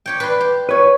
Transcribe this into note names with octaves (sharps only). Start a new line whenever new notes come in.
G4 C#5 G5
B4 D5 C6
G4
B4 C#5